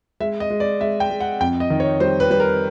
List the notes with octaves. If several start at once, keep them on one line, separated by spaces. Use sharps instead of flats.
G#3 E5
D#5
G#3
D5
G#3 E5
G5
G#3
F#5
F2 G5
D#5
D#3
C#5
G3 C5
B4
G3 B4
A#4